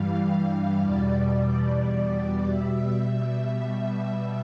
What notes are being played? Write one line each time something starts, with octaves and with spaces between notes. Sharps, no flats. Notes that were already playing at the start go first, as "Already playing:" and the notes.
Already playing: G2 E3 G3 F5
E2 B2 G3 D5
B2 G3 E5